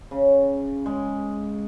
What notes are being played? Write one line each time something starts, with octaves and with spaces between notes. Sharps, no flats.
C#3
G#3